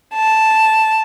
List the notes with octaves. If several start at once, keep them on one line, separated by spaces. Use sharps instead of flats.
A5